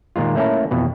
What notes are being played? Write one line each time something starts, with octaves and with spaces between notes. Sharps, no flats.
A#2 D#3 G#3 F4
A3 A#3 C#4 E4 A4
F2 B2 E3